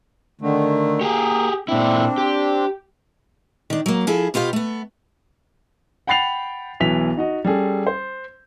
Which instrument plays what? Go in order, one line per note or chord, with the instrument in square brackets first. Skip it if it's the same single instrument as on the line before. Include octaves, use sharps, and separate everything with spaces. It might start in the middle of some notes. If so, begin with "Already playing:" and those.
[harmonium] D3 D#3 A3
[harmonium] A#3 [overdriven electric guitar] G4 G#4
[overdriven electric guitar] A#2 E4 [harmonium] C4 D4
[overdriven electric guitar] G4
[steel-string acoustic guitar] D#3 D4
F#3 A#3
F3 E4 G#4 A4
B2 B3 F4 G4 F5
A3 B3
[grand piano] F#5 G5 B5 A6 C7 F7
B1 B2 E3 B6 F7
D#4 F#4 D#5
G3 C#4 G#4 A4
C5